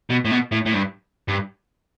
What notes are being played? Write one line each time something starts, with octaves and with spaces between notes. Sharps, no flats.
B2
A2
B2
A2
A2
G2
G2